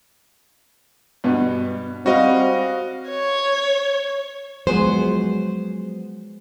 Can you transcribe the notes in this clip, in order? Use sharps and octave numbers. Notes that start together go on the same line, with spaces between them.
G2 B2
G3 C4 F#4 D#5 F5
C#5
F3 F#3 G#3 B3 G#4 C5